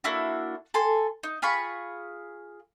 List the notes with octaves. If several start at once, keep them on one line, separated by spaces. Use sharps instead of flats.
A#3 D4 E4 F#4
A4 G#5 C6
D#4
F4 G#4 B5 C#6